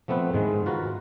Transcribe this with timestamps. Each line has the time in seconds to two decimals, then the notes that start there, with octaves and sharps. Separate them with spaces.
0.08 F3 A3 B3 C4 B4
0.34 G#2 D#3 G#3
0.66 F4 F#4 A#4 B4